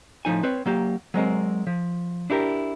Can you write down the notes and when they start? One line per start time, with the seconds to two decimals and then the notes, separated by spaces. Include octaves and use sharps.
0.25 A2 F3 F#3 D#4 G#5
0.43 C4 B4 C#5
0.66 F#3 A#3 G4
1.14 F#3 G#3 C4 A#4
1.67 F3
2.30 D4 E4 G4 A#4